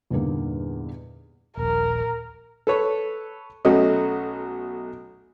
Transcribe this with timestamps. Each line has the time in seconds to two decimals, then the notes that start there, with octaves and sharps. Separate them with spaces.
0.10 E2 G2 A#2 D3 A#3 D#4
1.57 D#1 A#1 A#4
2.67 A4 B4 C#5
3.65 B1 A3 C#4 F#4 D#5